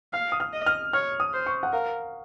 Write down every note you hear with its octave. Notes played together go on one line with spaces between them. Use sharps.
F5 F6
D#6
F6
D#5
F6
C#5 F6
D#6
C5
C#6
F#5
A#4 F5